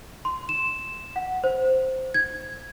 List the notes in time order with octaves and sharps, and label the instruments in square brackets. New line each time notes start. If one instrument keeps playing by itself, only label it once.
[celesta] C6
E7
F#5
C5
G#6